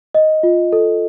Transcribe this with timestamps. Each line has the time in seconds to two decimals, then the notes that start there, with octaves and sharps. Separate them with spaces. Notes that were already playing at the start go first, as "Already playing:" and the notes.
0.15 D#5
0.43 F4
0.72 A4